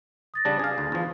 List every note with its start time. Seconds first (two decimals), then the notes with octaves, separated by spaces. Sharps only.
0.34 D#6 A6 A#6
0.45 C#3 G3 D4
0.59 G#4 F5
0.78 D2
0.92 E2 F3